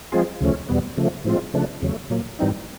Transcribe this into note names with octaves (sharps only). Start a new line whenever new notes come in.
F3 G#3 C4 F4 G#4
D2 C#3 F3 A3 C#4
E2 B2 G3 B3
C#3 F3 A3
A2 F3 G#3 C4 F4
C#3 F3 A3 D4
E2 C#3 F#3 A3
A#2 F#3 A#3
G#2 E3 G3 C4 D#4